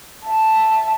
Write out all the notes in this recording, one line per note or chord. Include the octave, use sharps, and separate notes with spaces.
E5 A5